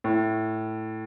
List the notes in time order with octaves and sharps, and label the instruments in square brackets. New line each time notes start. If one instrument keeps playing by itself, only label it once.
[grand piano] A2